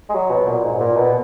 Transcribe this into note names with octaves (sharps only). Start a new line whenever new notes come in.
G#3
F#3
B2
A#2
G#2
A#2
B2